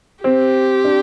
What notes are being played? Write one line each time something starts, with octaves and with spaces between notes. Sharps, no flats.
C4 G4
D4